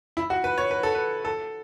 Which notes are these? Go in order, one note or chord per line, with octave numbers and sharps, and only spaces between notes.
E4
F#4
B4
C#5
B4
A4
B4
A4